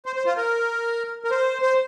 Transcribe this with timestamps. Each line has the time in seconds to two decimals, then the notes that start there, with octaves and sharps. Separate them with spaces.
0.06 C5
0.16 C5
0.26 F4
0.37 A#4
1.24 A#4
1.31 C5
1.62 C5